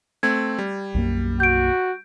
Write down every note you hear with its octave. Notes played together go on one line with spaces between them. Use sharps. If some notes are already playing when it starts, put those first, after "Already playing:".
A3 C4 G#6
G3
B1 F#2 A#3
F#4 G6 D7